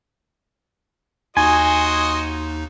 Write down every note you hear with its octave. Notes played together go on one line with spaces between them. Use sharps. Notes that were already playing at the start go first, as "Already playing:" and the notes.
D#2 D#4 F#4 D#5 G#5 C6